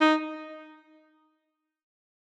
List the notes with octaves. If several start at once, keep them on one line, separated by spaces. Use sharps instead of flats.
D#4